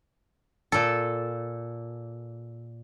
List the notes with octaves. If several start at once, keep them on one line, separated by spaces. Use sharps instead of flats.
A#2 A4